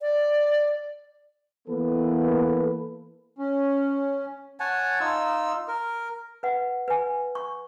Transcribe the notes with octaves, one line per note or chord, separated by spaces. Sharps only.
D5
E3 A#3 B3 A4 B4
C#4
C#5 F#5 G#5 A5
D#4 F4 E6
A#4
B4 F#5
B4 G#5
C#6